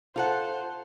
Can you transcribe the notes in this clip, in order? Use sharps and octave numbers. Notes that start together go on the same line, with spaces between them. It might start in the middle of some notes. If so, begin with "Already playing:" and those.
F4 A4 C5 F#5